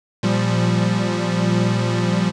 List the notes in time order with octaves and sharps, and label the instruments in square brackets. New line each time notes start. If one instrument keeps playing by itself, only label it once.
[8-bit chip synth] A#2 F3 G3